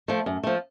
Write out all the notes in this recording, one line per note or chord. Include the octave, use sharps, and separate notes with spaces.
F3 A3
F#2
F3 A3